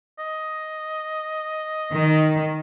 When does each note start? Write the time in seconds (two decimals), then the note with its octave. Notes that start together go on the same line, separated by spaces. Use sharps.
0.19 D#5
1.93 D#3